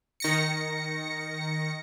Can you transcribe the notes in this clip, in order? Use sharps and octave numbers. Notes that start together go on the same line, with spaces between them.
D#3 A#6 C#7